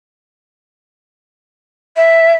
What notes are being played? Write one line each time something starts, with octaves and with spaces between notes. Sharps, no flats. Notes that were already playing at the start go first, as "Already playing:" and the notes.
E5